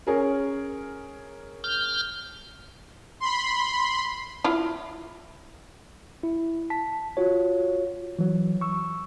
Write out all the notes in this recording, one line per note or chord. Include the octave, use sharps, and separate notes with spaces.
C#4 G#4 A#4
F6 G6
B5 C6
E4 F4
E4
A5 B6
F4 F#4 C#5
E3 F#3
C#6 E6